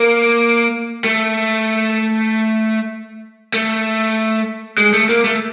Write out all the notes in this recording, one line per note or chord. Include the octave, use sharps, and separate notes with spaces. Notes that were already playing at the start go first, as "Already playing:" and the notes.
Already playing: A#3
A3
A3
G#3
A3
A#3
A3